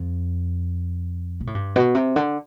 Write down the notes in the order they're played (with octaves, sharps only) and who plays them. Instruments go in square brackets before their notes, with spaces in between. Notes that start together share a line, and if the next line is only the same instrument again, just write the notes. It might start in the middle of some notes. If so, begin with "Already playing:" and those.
Already playing: [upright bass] F2
B2
A2
G2
B2
C3
D3